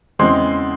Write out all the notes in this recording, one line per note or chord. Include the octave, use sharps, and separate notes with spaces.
E2 C#3 E3 G#3 C4 C6